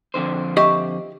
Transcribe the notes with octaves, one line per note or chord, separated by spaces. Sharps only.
F2 D3 C5
G4 D#5 E5 C#6